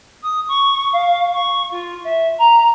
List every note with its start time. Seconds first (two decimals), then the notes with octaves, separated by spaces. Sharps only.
0.23 D#6
0.48 C#6
0.93 F5
1.33 C#6
1.71 F4
2.04 E5
2.39 A#5